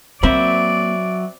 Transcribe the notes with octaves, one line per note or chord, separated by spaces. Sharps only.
F#3 A#3 C4 D5 E5 B5